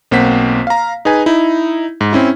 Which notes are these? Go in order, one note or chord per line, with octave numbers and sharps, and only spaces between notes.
B1 A#3 C4 C5 F#5 B6
F5 A#5
D#4 G#4 B4 G#5
D#4 E4
G#2
C4 C#4 E4